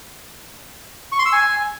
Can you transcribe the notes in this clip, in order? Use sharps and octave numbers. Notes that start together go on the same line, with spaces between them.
C#6
C6
E6
G#5